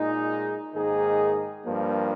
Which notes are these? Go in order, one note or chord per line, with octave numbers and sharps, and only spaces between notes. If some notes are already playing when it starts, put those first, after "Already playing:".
Already playing: A#2 G#3 D#4 G#4
G#2 D#3 A#3 D#4 G#4
G2 F3 A#3